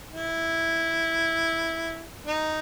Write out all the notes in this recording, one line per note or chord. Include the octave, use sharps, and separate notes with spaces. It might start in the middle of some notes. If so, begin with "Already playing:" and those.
E4
D#4